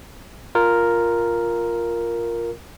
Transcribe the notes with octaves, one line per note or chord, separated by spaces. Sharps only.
F4 A#4